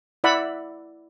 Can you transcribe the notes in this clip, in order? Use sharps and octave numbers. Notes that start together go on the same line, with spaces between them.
E4 D5 E5 F#5 B5